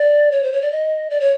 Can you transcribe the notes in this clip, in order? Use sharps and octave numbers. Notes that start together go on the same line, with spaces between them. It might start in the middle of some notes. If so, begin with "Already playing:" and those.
Already playing: D5
C#5
C5
C#5
D5
D#5
D5
C#5